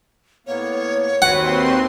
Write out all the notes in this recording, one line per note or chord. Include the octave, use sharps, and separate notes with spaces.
A2 A#3 B3 C#5
D#2 C4 F#4 B4 F#5 C6